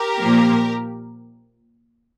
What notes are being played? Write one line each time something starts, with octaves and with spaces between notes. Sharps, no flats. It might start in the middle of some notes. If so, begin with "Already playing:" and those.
Already playing: G4 A#4
A#2 F3 A#3